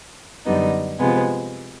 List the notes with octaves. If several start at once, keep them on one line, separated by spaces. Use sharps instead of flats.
F#2 D3 G3 B3 D#4
C3 F3 G#3 B3